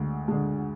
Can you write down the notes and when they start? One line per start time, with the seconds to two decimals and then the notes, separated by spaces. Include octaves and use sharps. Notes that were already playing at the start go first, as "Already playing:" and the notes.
Already playing: D2 D3 G#3
0.28 D3 G#3